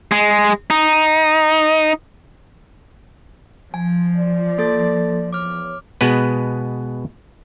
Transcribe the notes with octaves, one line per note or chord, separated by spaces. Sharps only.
G#3
D#4
F3 G#5
D5
A#3 A4 A6
E2 C#5 D6 F6
B2 G#3 B3 B4